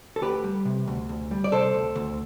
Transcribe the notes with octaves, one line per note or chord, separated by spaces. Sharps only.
A4
D2 G4 B4
G3
C3
D2
D2
G3
D5
C3 A4 C5
D2
D2